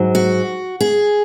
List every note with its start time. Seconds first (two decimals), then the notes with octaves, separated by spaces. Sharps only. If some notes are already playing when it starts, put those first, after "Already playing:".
Already playing: G#2 F#3
0.15 F#4
0.81 G#4